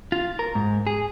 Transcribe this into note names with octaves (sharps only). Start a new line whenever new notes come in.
F4
A#4
G#2
G#4